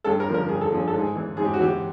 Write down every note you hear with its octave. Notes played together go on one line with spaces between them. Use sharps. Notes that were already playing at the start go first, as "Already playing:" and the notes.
G2 A4
A#4
D3 F3
A#4
G2 G#4
A4
D3 F3 G#4
A4
G#2
G#4
E3
G#2 G#4
G4
F#4
E3 G4